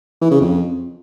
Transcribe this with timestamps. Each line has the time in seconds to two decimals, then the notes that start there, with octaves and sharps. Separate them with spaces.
0.21 E3
0.31 C#3
0.41 F2